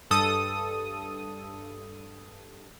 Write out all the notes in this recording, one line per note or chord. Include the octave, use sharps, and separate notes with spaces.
G2 A4 D#6